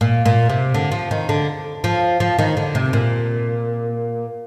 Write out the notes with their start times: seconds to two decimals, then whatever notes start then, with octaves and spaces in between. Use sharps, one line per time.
0.01 A#2
0.26 A#2
0.50 C3
0.74 D3
0.92 F3
1.11 D#3
1.29 D3
1.84 F3
2.20 F3
2.39 D#3
2.57 D3
2.75 C3
2.93 A#2